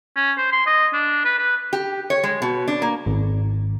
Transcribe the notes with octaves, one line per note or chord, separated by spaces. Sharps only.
C#4
C5
C6
D#5
D4
B4
B4
G4
C#5
G#3
B2
D4
A#3
G#1